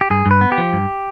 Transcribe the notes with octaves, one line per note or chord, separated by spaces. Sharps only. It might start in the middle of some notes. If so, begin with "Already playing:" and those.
G4
G2 G#4
G2
B4
B3
G4
F3
G2